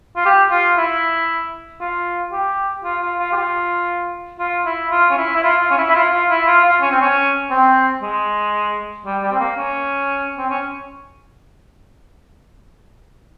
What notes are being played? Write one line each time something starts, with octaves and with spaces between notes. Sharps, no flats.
F4
G4
F4
E4
F4
G4
F4
F4
F4
G4
F4
F4
E4
F4
C#4
E4
E4
F4
F4
C#4
E4
E4
F4
F4
E4
F4
F4
C#4
C4
C#4
C4
G#3
G3
G3
C4
A#3
C#4
C4
C#4